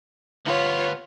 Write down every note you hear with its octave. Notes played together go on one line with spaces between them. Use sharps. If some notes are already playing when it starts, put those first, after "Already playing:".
D2 B3 F4 C#5